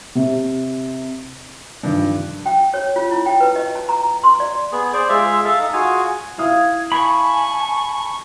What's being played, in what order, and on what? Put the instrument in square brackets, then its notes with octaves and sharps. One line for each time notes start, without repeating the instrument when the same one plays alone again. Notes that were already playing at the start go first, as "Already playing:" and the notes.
[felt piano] C3
[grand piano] G2 [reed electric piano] C3 D#3 F3
[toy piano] G5
C#5
F4
E4
G5
B4
D#5
A5
A#5
C6
D5
[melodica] B3 G#4
G#4 C5 D5
G#3 F4 G#4 E5
A4 E5 F5
D#4
F4 F#4 G#4 G#5
[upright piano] E4 F5 D#6 [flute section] G#6
[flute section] G#5 A5 [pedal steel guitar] B5 [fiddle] C#6